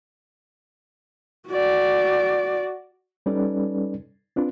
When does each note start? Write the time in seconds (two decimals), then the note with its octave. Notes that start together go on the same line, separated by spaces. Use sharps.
1.49 F#4 D5
3.26 G3 C#4 D#4 A4 B4 D5
4.36 C4 D4 F4 B4